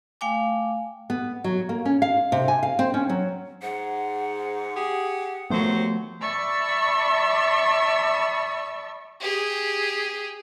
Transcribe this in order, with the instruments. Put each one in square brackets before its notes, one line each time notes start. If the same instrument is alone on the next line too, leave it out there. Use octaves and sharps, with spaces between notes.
[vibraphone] A3 F5 G5 G#5 D6
[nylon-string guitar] B3
F#3
A#3
C#4
F5
C3
G#5
F5
C4
C#4
F#3
[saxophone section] G#2 [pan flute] F#5
[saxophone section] G4 G#4
[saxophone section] D#2 F#3 C5 [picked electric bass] F3 A3 B3
[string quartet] D5 E5 A5 B5 C#6 E6
[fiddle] G4 G#4